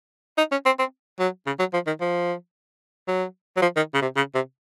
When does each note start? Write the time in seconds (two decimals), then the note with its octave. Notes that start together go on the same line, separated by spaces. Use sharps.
0.38 D#4
0.52 C#4
0.66 C4
0.79 C4
1.20 F#3
1.47 C#3
1.59 F#3
1.74 F3
1.87 D#3
2.01 F3
3.08 F#3
3.57 F#3
3.62 F3
3.76 D#3
3.94 C#3
4.02 C3
4.16 C#3
4.35 C3